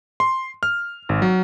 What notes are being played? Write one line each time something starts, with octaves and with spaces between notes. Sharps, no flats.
C6
F6
G#1
F#3